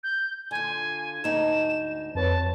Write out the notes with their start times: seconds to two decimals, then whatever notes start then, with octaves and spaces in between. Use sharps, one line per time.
0.04 G6
0.51 D3 F4 G#5
1.24 D2 G#2 D#4 E7
2.15 F2 B4 C#5 A5